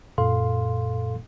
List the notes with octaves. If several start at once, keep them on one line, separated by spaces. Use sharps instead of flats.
F#2 A#2 A4 F5 C6